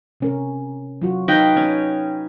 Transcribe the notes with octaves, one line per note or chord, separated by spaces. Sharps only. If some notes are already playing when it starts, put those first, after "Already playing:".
C3 C#4 A#4
F#3 F4 F#4
D#4 B4 F5 G5
C#4